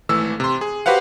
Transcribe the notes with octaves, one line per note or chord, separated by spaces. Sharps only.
G#1 E3 A3 E6
C3 C6
G#4
F#4 G4 B4 C5 F5 F#5